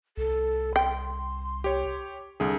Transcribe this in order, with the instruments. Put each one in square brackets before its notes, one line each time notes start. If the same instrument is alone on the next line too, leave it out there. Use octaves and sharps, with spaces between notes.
[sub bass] C2 [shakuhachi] A4
[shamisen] G5 [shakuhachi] C6
[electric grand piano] G4 C#5
C2 D3 G#4